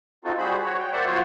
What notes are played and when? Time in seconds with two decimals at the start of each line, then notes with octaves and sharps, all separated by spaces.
0.25 C4 D#4 F4 F#4 A4
0.38 G3 F#4 G#4 C5 B5
0.64 F#4 C#5
0.79 G5
0.92 A#3 C5 D5 E5 F#5
1.07 F#3 B3 F4 F#4 C5 C#5